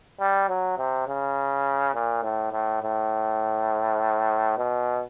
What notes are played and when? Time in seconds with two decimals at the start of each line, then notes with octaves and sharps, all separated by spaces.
0.20 G3
0.49 F#3
0.78 C3
1.07 C#3
1.94 A#2
2.23 A2
2.52 A2
2.82 A2
4.58 B2